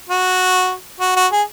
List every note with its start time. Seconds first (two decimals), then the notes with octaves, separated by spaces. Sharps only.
0.09 F#4
1.00 F#4
1.16 F#4
1.32 G#4